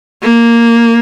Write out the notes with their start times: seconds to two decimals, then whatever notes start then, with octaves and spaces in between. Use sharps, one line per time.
0.23 A#3